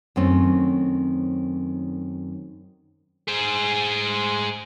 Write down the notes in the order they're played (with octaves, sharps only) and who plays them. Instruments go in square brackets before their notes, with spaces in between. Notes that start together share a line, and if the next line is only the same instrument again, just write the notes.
[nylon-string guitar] F#2 D#3 A3 C4 C#4
[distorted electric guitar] G#4 C5